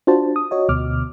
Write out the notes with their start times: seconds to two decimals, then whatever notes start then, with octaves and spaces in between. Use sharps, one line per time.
0.07 D4 F4 F#4 C5 A5
0.36 D#6
0.51 F#4 C#5 D#5
0.69 D2 B2 D6 F6